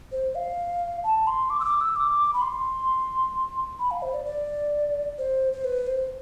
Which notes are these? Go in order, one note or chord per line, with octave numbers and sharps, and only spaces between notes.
C5
F5
A5
C6
D6
E6
D6
E6
D6
B5
C6
B5
F5
C5
D5
D5
C5
C5
B4
C5